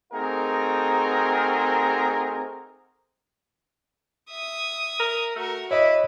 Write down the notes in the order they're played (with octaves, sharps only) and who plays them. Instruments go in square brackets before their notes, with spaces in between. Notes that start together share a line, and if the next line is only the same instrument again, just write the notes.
[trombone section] A3 C4 D#4 F#4 G#4 A#4
[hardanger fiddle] E5 D#6
[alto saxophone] A#4
[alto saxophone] A3 [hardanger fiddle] F#4 A#4
[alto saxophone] E4 [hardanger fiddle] B4 [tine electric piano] C#5 D#5